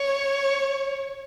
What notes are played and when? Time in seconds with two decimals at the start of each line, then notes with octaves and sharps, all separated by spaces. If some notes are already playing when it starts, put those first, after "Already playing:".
Already playing: C#5